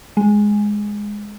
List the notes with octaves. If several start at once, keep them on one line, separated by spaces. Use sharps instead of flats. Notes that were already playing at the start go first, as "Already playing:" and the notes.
G#3